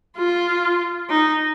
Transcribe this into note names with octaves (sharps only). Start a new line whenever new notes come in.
F4
D#4